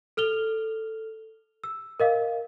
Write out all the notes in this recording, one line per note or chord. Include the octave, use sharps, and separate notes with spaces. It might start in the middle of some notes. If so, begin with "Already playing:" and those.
A4 F6 F7 G7
E6
A#4 D#5 F5